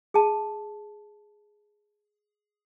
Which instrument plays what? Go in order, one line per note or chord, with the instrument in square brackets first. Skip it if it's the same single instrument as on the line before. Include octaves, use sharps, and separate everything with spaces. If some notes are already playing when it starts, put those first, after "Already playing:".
[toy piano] G#4 A5